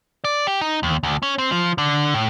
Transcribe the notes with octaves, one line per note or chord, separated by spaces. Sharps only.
D5
G4
D#4
D#2
D2
C#4
C4
F3
D3
A2